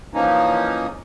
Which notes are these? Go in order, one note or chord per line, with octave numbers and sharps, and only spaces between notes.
E3 F3 A#3 C#4 D#4